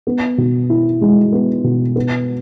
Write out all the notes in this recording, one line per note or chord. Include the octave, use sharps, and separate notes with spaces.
B3
B2
E4
G#3
B3
B2
B3